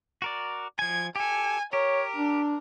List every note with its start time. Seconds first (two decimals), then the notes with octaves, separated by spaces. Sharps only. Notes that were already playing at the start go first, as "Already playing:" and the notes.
0.22 F#4 A#4 D5
0.79 F3 G#5 G#6
1.16 G4 A4 G#5
1.73 G4 A#4 C#5
2.16 D4